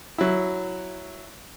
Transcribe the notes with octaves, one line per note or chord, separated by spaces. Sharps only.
F#3 E4